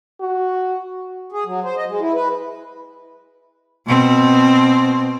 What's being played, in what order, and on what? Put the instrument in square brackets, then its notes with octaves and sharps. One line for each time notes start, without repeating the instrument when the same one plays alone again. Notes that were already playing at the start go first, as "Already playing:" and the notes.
[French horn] F#4
[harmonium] G#4
F#3
C5
D#5
G#3
E4
B4
[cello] B2 C4